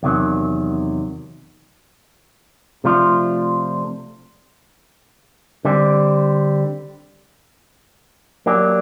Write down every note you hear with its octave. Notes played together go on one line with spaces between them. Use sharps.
E2 C3 D#3 F#3
C3 F3 A3 D4 F4
D3 G3 C4
F#3 A#3 D4 G4